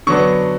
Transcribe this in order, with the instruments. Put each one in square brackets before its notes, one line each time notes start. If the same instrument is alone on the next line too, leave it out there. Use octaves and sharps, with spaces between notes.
[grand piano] D3 F#3 B3 D4 C#6